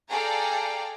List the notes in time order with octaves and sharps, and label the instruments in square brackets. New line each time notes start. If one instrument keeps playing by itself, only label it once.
[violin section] G#4 A4 D5 F5 G5 A#5